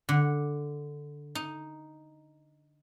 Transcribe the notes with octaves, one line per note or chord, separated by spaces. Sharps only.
D3
D#4